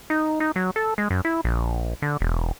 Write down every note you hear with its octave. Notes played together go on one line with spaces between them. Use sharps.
D#4
D#4
F#3
A4
G#3
F#2
E4
A#1
D3
E1